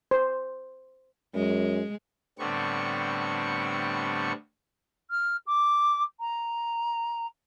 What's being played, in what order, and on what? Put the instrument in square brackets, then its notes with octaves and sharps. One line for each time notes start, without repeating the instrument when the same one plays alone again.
[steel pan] C5
[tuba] F#2 [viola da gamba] G#3
[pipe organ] A2 D3 G3 B3 C4 C#6
[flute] F6
D6
A#5